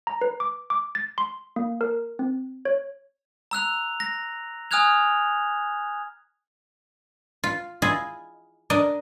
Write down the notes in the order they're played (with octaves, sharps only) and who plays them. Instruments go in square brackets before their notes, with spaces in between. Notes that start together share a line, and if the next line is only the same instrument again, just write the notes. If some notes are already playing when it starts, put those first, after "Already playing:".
[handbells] A#5
B4
D6
D6
A6
C6
A#3
A#4
C4
C#5
[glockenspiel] A#5 E6 F#6 F7
A#6
G#5 D#6 F6 F#6 G#6 F7
[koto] F4
E4 F4 G#4 D#5
D4 A#4 D#5